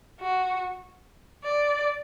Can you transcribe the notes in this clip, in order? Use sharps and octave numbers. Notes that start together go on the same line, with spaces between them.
F#4
D5